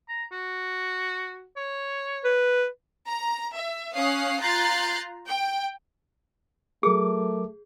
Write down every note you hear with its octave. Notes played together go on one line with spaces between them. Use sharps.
A#5
F#4
C#5
B4
A#5
E5
C#4 F5 D#6 F#6 C7
F4 A#5 F#6 G6 A6 C7
G5
F#3 A3 G#4 A#4 D6